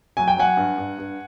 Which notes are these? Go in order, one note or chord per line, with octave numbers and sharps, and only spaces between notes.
F#3 G#5
G5
F#3 F#5 G#5
G2
G2
G2